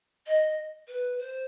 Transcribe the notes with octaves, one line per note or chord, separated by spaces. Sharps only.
D#5
B4
C5